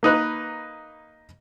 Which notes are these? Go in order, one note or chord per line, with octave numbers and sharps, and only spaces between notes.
A#3 D#4 B4 F#6